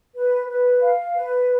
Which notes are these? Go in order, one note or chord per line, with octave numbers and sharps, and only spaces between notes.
B4
B4
F5
B4